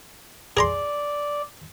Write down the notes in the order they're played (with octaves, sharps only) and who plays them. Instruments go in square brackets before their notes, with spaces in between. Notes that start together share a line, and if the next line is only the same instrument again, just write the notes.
[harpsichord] G#4 A#5 C6 [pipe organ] D5